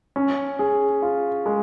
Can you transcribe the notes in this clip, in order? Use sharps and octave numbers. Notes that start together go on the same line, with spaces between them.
C#4
G#4
F4
G#3